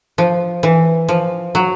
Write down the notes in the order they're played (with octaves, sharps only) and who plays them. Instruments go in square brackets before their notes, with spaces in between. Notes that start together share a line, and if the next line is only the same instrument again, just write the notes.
[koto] F3
E3
F3
F#3